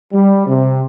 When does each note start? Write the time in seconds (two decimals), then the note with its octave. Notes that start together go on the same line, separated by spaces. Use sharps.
0.12 G3
0.46 C3